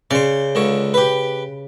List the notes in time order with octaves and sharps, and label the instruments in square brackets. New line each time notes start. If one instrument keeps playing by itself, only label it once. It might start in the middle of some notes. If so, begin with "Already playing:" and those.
[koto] C#3 [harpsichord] C5 D5
[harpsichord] C#2 D3 C#5
G4 B4